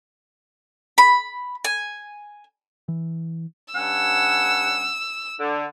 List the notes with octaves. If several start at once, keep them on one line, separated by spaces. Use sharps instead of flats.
B5
G#5
E3
G2 C#4 F#5 E6
D3